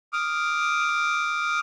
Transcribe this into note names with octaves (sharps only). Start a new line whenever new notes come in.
D6 D#6 F6